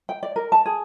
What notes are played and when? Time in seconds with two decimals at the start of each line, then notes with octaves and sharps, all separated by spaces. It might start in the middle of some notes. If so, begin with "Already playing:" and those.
0.09 G5
0.23 D5
0.36 A#4
0.52 A5
0.66 G#4